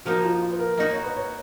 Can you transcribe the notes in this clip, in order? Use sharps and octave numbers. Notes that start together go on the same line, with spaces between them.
F3 A#3 D#4 F#4
F4
F4
B4
A#4
A#3 D#4 F#4 D#5
C#5
B4
C#5